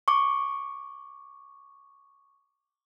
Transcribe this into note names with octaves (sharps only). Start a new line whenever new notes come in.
C#6 D6